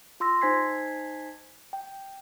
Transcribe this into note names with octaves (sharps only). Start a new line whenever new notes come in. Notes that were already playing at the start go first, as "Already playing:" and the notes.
F4 C6 E6 A#6
D#4 C5 G#5 G#6 B6 C7
G5